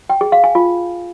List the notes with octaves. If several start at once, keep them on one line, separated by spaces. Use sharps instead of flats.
G5
G#4
F5
G#5
F4